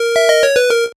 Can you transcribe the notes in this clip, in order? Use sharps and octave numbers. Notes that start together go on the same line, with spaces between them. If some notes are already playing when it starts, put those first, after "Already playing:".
Already playing: A#4
E5
D#5
C#5
B4
A#4